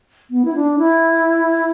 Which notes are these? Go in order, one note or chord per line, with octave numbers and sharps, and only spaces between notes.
B3
E4
D4
E4